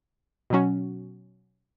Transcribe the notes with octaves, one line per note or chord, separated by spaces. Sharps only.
B2 F#3 C#4 F#4